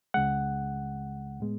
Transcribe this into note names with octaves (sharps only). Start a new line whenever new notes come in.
C#2 C#3 G#3 F#5
A2 G#3 B3